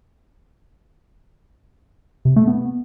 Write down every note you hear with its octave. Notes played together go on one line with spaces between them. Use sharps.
C3
A3
B3